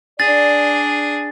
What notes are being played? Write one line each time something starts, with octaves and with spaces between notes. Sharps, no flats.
D4 G#4 D5 A6